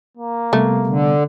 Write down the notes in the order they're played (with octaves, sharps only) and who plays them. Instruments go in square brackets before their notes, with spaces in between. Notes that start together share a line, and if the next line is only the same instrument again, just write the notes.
[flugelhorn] A#3
[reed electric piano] C3 G3 B3 [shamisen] A3
[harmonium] D3